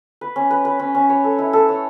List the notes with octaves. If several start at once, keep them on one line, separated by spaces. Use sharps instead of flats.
B4
C#4
B4
B4
C#4
C#4
C#5
A4
E4
A4
C#5